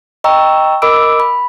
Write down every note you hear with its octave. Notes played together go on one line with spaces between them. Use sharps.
D#5 G5 A#5 C#6 E6
A#4 D#5 B5 D6 E6 D7
B5